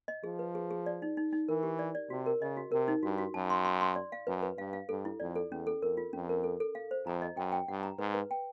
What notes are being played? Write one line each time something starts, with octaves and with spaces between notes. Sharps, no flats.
D#5
F3 G#4
B4
G#4
G#4
D5
D#4
D#4
D#4
E3 A#4
G4
D5
D5
C3 F#4
A#4
C#3 D#5
F#4
C3 A#4
D#4
G2 F#4
F#4
F#2 A5
C6
C6
C6
D5
F5
F#2 B4
B4
G2 F5
F5
G2 A4
E4
F2 D5
A4
E2 C#4
A4
F2 A#4
F4
F2 C#4
A#4
A4
A4
F5
C5
F2 A#5
D#5
F#2 G5
G5
G2 F#5
A#5
G#2 B4
B4
G5